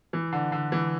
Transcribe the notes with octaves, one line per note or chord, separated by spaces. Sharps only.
E3
D3
D3
E3